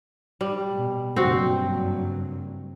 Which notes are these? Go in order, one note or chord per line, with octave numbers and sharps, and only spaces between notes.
G3
B2
F#1 G2 F#3 C4 F#4